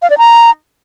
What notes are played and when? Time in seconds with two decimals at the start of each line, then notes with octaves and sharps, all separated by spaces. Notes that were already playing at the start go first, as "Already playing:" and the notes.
0.02 F5
0.10 D5
0.18 A#5